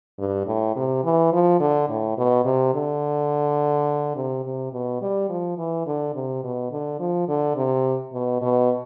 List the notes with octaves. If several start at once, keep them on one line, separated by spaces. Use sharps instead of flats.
G2
A2
C3
E3
F3
D3
A2
B2
C3
D3
C3
C3
B2
G3
F3
E3
D3
C3
B2
D3
F3
D3
C3
B2
B2